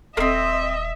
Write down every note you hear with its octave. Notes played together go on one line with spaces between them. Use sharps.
D#1 A#3 C4 D#5 E5